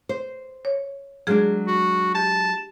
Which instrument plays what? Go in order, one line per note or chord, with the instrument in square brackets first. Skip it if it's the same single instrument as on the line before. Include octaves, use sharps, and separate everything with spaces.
[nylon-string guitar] C5
[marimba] C#5
[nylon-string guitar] F#3 G#3 D4 [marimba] G#4 F6
[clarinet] F#4
[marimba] G4 [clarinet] A5